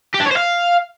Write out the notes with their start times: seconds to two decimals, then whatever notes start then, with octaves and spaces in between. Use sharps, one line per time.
0.15 G4
0.20 D4
0.26 C#5
0.32 C5
0.37 F5